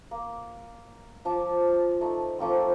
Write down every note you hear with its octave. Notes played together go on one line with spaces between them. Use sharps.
A#3
F3 A5 D6
A3 D#4
F3 A3 A#3 C4